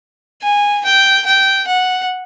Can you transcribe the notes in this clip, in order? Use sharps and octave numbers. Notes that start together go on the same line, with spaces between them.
G#5
G5
G5
F#5